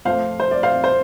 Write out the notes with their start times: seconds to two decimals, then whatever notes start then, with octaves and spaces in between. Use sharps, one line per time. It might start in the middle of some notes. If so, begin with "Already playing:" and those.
0.05 F2 F3 A3 C5 F5
0.40 C5
0.51 D5
0.63 C5 F5
0.84 C5